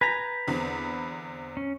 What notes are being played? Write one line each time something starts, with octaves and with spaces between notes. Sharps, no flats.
B4 G#5 A#5 G6 A#6
E2 D3 C4
C#4